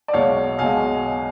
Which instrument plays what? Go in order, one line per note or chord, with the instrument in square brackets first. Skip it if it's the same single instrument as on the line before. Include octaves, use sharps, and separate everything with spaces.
[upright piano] D5
B1 B2 G#3 C#5 F5
B1 B2 G#3 F5 G#5